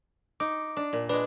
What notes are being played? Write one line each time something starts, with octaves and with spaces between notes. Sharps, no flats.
D#4 D6
D4
A#2
G#3 D4 B4